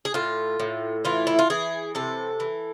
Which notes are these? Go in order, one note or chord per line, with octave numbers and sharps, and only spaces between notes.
G#4
A2 F4
A2
E3 F4
E4
F4
E3 G#4
C3 A4
E3